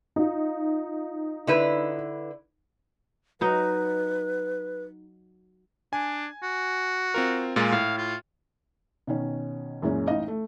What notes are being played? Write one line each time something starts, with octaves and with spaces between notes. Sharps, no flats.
D#4 F4
D3 E4 B4
F#3 D#4 B4
D4 G#5
F#4
C4 F4 A#4
A#2 G#3 F4
A2 F5
F4
B2 D#3 C#4
F#2 A#2 E3 G#3 C#4
A1 D#4 D#5 F5
A3